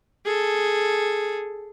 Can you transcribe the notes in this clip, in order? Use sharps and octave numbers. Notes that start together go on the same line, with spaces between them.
G#4 A4